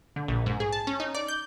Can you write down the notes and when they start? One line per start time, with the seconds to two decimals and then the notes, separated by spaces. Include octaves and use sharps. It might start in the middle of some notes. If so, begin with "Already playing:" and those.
0.16 D3
0.28 A#1
0.46 G#2
0.60 G#4
0.73 A5
0.87 C#4
1.00 D#4
1.15 D5
1.28 G6